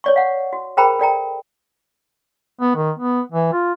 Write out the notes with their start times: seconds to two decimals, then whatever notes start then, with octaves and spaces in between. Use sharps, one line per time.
0.04 C#5 D5 C#6
0.16 F5 F#5
0.53 F#4
0.77 G#4 A#4 C5 G5 A#5 B5
0.99 A4 D5 G5 A#5
2.61 B3
2.76 D#3
2.99 B3
3.32 E3
3.53 F4